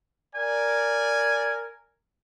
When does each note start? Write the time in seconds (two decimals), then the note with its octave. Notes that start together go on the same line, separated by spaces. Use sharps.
0.36 A#4 D5 G#5